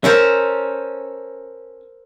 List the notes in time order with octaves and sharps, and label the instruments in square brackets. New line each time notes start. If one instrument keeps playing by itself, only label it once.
[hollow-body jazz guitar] C#4 [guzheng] A4 A#4 C5